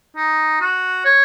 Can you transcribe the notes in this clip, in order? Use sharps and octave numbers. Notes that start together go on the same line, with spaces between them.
D#4
F#4
C#5